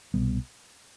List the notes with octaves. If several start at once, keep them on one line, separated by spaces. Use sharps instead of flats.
C2 B2 G3 B3